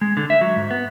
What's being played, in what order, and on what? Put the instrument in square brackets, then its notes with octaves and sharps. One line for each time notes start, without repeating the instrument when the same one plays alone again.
[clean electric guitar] G#3
D3
E5
F#3
G#2
B3